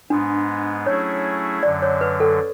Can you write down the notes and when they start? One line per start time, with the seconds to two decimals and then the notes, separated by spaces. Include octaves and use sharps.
0.10 G#2 G#3 B3 D4
0.86 F#3 A3 C#4 E4 G#4 C#5
1.63 F#2 D3 F#3 D5
1.82 C#5
2.01 B4
2.20 A4